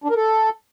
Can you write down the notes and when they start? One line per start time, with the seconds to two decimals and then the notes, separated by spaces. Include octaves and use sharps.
0.04 D4
0.10 A#4
0.16 A4